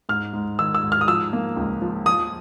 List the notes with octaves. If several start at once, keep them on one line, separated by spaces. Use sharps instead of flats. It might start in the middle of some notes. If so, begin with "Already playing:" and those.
G#2 F6
G#2
D#3 E6
E6
G#2
F6
D#6
F3 E6
A#3
C#2
F3
F3 D#6